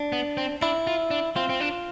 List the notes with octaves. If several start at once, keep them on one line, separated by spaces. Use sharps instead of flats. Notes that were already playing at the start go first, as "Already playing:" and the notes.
Already playing: D4
B3
C4
D4 E4
F4
D4
C4 F4
C4
D4